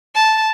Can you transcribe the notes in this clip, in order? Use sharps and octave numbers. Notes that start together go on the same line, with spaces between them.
A5